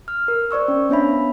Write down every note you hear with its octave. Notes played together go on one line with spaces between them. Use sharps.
F6
A#4
C5 D5 C#6 E6
C#4
B3 D4 C#5 E5 B5